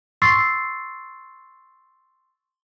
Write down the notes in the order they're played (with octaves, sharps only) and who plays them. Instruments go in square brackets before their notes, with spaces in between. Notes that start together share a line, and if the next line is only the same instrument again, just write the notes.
[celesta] C6 C#6 E6 A6 C7